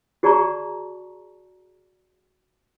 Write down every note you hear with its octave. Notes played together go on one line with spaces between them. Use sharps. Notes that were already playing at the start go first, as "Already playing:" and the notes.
F#4 G#4 D5 A5 A#5 C#6